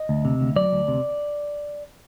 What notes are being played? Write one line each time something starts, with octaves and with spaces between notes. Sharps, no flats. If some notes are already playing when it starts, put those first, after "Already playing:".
Already playing: D#5
D2
C3
D2
F#3 D5
D2
C3